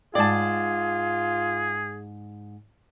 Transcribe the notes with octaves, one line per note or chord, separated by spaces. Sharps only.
G#2 F4 G#4 D5 G5 A5